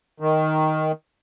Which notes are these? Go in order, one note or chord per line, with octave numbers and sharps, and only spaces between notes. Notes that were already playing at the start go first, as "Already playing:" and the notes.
D#3